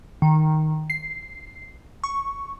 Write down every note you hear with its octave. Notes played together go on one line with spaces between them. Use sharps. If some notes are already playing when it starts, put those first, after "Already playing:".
D#3
C7
C#6